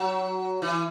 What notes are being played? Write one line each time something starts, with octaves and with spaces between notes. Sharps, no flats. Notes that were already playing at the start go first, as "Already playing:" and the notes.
Already playing: F#3
E3